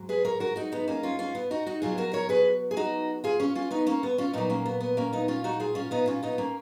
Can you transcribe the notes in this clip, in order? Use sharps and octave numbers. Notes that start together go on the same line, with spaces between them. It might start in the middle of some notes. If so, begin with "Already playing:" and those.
Already playing: G#2 F#3
G#4 B4
A#4 C#5
F#4 A#4
D#4 F#4
B3 D#4
A#3 C#4
C#4 F4
C#4 F4
B3
D#4 F#4
D#4 F#4
B2 F#3 F4 G#4
F#4 A#4
A#4 C#5
G#4 B4
G#4
D#4 F#4
F4 G#4
C#4 F4
C#4 F4
B3 D#4
A#3 C#4
B3
C#4 F4
A#2 F#3 B3 D#4
A#3 C#4
B3
B3
A#3 C#4
B3 D#4
C#4 F4
D#4 F#4
F4 G#4
C#4 F4
B3 D#4
C#4 F4
B3 D#4
A#3 C#4